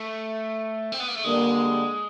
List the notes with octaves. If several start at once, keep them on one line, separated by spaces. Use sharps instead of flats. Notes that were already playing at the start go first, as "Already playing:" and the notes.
Already playing: A3
C4
B3
A#3
A3
D3 G3 G#3 A#3